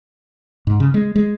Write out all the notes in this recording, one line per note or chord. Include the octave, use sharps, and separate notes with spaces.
G#2
C#3
G#3
G#3